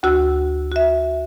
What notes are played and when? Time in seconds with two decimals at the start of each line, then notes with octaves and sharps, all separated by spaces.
0.03 D2 F#4 E6
0.72 F#4 E5